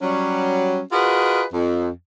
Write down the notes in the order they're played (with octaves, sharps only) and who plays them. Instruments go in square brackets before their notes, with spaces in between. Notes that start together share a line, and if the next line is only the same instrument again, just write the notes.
[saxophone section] F#3 G3 C#4
F4 F#4 G#4 A#4 B4 D#5
F2